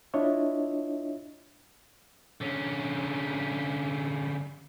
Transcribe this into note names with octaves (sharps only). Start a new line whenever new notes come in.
D4 E4 F4 C#5 D#5 E5
D3 C#4